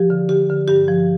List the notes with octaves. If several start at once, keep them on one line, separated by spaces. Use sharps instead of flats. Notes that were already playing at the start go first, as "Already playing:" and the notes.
Already playing: F3 G4
D3
D3 G4
D3
G2 G4
F3